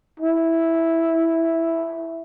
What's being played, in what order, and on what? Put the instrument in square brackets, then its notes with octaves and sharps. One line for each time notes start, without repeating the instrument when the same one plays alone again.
[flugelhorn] E4